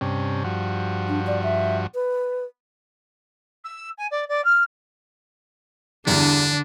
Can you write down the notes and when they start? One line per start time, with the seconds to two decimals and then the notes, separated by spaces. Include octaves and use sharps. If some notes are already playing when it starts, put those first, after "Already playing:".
0.01 G2 C3 C#4
0.44 G2 F3 F#4
1.09 D4
1.27 D5
1.43 E5
1.95 B4
3.65 E6
3.98 G#5
4.11 D5
4.29 D5
4.45 F6
6.07 E2 G2 D3 D4